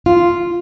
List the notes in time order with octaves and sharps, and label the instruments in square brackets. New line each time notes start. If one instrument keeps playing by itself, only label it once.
[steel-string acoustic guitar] F4